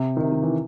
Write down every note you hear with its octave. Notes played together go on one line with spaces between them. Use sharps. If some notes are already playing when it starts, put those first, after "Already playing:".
Already playing: C3
D#3
C3
D#3
E3